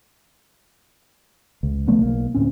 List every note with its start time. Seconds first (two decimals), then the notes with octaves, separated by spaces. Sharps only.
1.63 C#2
1.88 C#3 F3 A3 B3
2.01 B1 A#3
2.34 D2 A2 C4 C#4